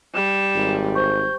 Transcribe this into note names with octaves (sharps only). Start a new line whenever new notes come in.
G3 E7
G#1
C5 C#6 G6